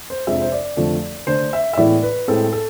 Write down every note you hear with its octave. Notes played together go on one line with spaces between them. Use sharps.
C5
F2 C3 F3 G#3 D4 E5
C5
D5
F2 D3 F3 A3
D3 A3 D4 C5
E5
E5
A2 E3 G#3 B3 D5
B4
A2 G#3 C4 A4
A4